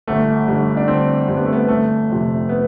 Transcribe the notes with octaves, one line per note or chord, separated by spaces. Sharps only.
G1 A3
G2 D3
D4
G1 C4
G2 D3 C4
B3
A3
B3
G1 A3
F2 C3
B3